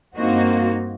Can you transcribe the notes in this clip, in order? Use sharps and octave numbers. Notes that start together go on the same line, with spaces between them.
G2 A#3 C4 D#4 F#4